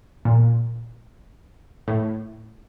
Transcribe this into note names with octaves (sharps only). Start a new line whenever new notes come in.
A#2
A2